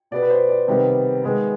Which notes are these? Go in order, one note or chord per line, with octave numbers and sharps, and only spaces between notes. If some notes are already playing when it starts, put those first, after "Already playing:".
B2 B3 D5
B4
C5
D5
C3 D#3 G3 B3
D#3 G#3 B3